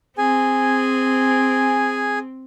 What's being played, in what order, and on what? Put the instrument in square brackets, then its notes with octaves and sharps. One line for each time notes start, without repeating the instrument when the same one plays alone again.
[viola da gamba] C4 [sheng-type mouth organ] G#4 G#5